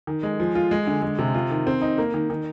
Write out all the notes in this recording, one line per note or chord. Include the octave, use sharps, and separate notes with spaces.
D#3
G#3
F3
F4
G#3
D3
G#3
C3
F4
D#3
C4
D#4
A#3
D#3
D#3